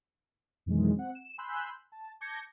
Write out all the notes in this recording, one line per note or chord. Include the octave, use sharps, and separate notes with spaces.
F2 B2 D#3 E3 F#3 G#3
C4 F#5
E7
G#5 B5 C6 E6 F#6 G6
A5
A5 D6 G6 G#6 A#6 C#7